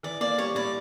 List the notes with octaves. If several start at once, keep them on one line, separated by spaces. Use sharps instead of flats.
E3 D5
A#3 D5
G3 C#5
A2 D5